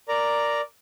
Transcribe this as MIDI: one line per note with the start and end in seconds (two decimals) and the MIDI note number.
0.08 0.61 70
0.08 0.61 74
0.08 0.61 82